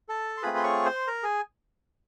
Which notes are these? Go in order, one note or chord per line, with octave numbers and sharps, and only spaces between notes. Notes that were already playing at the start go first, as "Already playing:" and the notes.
A4 A5
C6
A3 C4 F4 G#4 B4 B5
C6
C#5 C#6
C5 C6
A#4 A#5
G#4 G#5